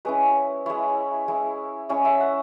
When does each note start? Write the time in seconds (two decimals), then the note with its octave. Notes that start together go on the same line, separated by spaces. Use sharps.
0.05 G#3 C#4 E4 B4
0.66 G#3 E4 C#5
1.28 G#3 E4
1.89 G#3 C#4 E4 C#5
2.05 E5
2.21 F#5